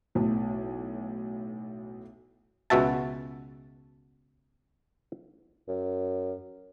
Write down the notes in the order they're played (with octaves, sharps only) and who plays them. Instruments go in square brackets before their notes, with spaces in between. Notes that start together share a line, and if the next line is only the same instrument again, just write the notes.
[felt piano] B1 A2
[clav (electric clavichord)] C#2 B2 F#4 E5 A5
[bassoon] F#2